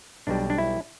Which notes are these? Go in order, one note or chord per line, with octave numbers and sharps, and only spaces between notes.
B1 B2 G3 D4
D4
E4